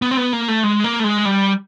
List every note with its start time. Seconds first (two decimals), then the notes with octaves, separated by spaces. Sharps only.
0.02 B3
0.11 C4
0.17 B3
0.33 A#3
0.48 A3
0.64 G#3
0.84 A#3
1.00 A3
1.04 G#3
1.25 G3